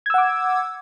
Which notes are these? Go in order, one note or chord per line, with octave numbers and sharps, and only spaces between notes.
F#5 D6 E6 G#6